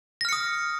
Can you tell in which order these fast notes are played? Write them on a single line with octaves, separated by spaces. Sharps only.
A#6 F6 C#7 D#6